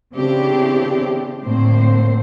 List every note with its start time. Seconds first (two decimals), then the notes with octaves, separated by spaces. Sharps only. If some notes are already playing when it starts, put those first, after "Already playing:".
0.14 C#3 E3 B3 C4 D4 G4
1.44 A2 D3 A#3 C4 C5